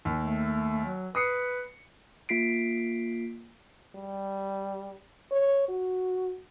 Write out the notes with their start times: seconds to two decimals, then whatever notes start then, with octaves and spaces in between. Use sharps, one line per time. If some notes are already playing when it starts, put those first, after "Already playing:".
0.05 D#2
0.20 A3
0.85 F#3
1.15 B4 D#6 C7 C#7
2.29 A#3 F4 B6 C7 D7
3.96 G3
5.32 C#5
5.69 F#4